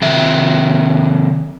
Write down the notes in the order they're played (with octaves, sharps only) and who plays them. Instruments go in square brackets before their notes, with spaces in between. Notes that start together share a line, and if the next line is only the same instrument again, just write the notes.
[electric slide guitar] C3 D#3 E5